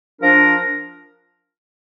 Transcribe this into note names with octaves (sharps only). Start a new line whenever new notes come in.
F3 D4 A#4